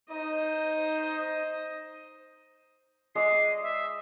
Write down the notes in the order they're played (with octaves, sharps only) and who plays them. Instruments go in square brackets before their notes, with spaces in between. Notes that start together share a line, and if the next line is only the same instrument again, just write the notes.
[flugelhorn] D#4 [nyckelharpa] C5 D#5
[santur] G#3 D5 D#5 [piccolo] C7
[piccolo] E5